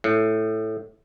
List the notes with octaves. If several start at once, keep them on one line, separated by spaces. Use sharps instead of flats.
A2